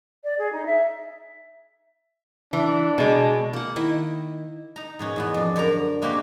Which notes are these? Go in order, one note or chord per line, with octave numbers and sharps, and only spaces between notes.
D5
G#4
D#4
E5
E3 D4
B2 G#3
A#3 F#5
D#3 E4 D#5 E5
D#4 A#5
G#2 B2 C#4
E2 B2 B3
F2 D4
F#2 D3 A#4 A#5
G#3 A#3 C4 F#4 G4 C5